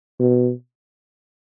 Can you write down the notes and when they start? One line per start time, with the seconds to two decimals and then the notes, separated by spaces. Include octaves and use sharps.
0.19 B2